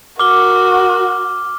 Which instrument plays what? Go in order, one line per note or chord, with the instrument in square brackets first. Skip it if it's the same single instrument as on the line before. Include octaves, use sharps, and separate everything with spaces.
[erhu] F#4 [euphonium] A#4 [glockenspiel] D6 F6 G7